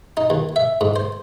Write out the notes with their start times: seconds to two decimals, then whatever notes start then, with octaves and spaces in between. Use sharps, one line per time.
0.17 D#4
0.30 D#2
0.56 E5
0.81 G#2
0.96 C5